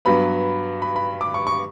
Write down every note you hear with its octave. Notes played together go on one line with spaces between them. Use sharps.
G2 F#3 B3 B5
B5
B5
D6
C#6
C#6